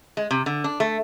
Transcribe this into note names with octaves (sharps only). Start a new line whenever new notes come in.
G#3
C3
D3
D4
A3